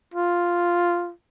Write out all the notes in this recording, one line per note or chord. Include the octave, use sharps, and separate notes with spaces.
F4